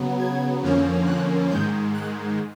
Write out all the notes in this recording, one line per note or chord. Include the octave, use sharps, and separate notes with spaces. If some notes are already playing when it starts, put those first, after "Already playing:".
Already playing: C#3 F#3 B3
G#6
F2 D3 F3 A#3 C#4
F#6
G#2 D#3 G#3 G6
F#6